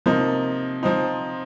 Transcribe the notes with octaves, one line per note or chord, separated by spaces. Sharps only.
C3 F3 A#3 D#4
F3 C4 D#4